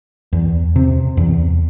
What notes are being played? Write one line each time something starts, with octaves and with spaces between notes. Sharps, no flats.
E2
C3
E2